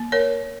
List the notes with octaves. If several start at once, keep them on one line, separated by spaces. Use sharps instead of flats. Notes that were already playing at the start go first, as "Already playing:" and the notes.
Already playing: A#3
A#4 C#5